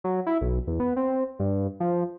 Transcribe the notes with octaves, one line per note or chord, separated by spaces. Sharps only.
F#3
E4
B1
E2
B3
C4
G2
F3